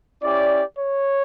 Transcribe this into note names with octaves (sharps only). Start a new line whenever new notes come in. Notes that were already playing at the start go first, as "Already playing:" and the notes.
C#4 E4 G4 D5
C#5